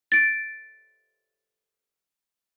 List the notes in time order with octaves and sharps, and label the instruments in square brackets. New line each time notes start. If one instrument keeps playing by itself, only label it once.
[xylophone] A6 D7